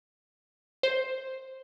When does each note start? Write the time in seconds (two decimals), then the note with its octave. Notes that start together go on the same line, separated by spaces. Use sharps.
0.83 C5